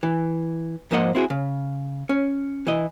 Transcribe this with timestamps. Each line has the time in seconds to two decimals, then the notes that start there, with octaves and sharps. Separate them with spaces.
0.03 E3
0.91 G#2 F3 A#3 C5 D#5 F#5
1.15 C4 E4 F#4 G#4
1.30 C#3
2.09 C#4
2.67 E3 E4 D#5